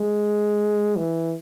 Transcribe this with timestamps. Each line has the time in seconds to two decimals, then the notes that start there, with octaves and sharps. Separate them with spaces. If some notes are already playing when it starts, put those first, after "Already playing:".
Already playing: G#3
0.96 E3